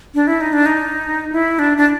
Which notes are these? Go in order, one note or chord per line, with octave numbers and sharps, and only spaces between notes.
D4
E4
D#4
D4
D#4
E4
D4
D4